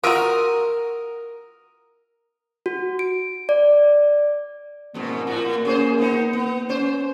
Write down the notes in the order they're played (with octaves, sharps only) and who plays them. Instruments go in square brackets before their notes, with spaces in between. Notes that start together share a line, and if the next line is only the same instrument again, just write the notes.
[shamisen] F4 F#4 [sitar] A#4 [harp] D#6 E6
[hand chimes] F#4
D7
D5
[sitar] F2 G#2 B2 [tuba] A#3
[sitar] A2 F#4
C#4 G#4 C5
B3 D#4
B3
C#4 C5